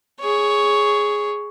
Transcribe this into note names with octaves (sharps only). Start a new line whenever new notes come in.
G#4 C#5